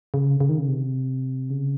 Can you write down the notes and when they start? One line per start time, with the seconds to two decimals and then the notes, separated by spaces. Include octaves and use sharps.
0.14 C#3
0.40 C#3
0.49 D#3
0.59 C#3
0.68 C3
1.50 C#3